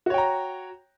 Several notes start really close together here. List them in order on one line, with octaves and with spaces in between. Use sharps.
F#4 C#5 G5 A#5